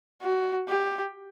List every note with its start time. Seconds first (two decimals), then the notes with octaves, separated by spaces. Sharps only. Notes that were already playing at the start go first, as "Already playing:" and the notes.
0.22 F#4
0.69 G4